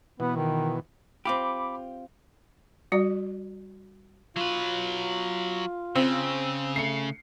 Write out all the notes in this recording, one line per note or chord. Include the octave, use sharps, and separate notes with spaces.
B2 E3 B3
D#3
C4 F4 G4 B5 D6
G3 F#4 D5
F#3 F4 B4
C#3 C4
A3 C7 C#7